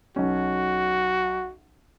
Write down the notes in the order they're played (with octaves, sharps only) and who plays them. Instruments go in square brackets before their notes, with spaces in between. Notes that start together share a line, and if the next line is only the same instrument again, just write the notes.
[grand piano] B1 C#4 [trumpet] F#4